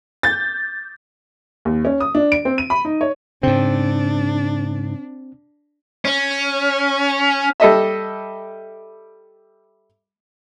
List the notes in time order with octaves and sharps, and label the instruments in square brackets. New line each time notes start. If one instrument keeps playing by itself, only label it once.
[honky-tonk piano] G6 A6
[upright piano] D#2
C#4
D#6
D4
D7
C4
D#7
B5
D#4
C#5
[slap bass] G#2 C#3 [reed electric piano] C4 [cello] D4
[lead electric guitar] C#4
[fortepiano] G3 A4 D#5 E5